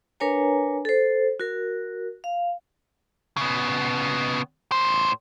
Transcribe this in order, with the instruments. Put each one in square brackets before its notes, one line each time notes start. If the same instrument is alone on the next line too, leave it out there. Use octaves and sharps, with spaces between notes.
[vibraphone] D4 A#4 B4 C#5 G#5 A#5
A4 C5
F#4 A#4
F5
[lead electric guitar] C#3 B3
A2 C5